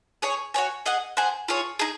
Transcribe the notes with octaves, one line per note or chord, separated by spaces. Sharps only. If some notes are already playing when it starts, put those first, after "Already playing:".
G#4 C#5 G#5
F#4 C#5 G#5
G#4 D#5 F#5
G#4 C5 F#5
F4 G#4 C#5
D#4 G#4